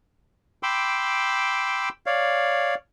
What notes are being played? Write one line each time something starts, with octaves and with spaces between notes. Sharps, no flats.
G5 B5 C6 D6 E6
C#5 D5 F5